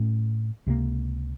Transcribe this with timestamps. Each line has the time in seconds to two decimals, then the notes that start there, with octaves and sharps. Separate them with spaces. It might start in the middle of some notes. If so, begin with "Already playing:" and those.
Already playing: A2 A3 C#4
0.66 C#2 C3 F3 A#3